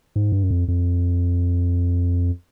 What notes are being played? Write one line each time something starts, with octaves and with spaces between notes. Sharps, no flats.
G#2
G2
F#2
F2
F2